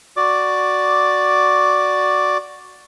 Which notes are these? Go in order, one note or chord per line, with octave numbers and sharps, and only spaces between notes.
F#4 D5 D6